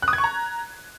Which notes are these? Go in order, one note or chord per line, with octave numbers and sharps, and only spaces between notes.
F#6
D#6
G#6
C#6
A#5